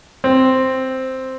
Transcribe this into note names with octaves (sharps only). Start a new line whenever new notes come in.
C4